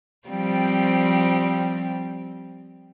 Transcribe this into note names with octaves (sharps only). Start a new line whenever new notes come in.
F3 G3 C4